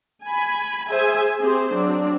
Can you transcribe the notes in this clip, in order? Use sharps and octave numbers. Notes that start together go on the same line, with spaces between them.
G#5 B5
G#4 C5 E5 G#5
C4 G4 G#4 C5
F#3 C4 D4